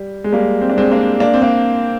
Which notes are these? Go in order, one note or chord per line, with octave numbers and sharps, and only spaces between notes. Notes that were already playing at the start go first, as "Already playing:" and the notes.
Already playing: G3
G#3
G3 A#3
C4
D4
G#3 C4
A#3 D4
A#3 D4
C4
A#3 D4